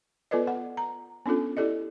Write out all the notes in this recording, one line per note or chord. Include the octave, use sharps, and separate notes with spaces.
B3 F4 A4 B4 D5 D#5
F#5
A#5
B3 C#4 D4 F4 A4
E4 G4 A4 D5 D#5